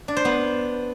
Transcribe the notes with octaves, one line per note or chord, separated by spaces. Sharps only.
D4
C5
B3